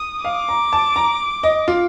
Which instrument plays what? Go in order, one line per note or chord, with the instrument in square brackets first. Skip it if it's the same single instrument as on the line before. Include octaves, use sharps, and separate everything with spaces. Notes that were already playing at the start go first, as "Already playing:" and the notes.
Already playing: [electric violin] D#6
[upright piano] F5 [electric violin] D6
[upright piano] A#5
A5
A#5
D#5
F4